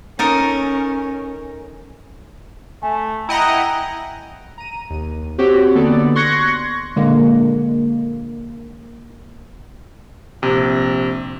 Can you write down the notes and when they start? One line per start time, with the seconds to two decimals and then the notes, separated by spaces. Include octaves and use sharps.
0.19 C#4 D#4 A4 A#4
2.83 A3 G#5
3.29 E4 D#5 F#5 G5 A#5
4.58 A#5 D#7
4.90 D#2
5.38 C4 F#4 G4 C#5
5.75 D3 A#3 B3 D4 A4 D5
6.15 C6 C#6 F#6 G#6 A#6 C#7
6.96 A#2 D3 G#3 A#3
10.42 A#1 C3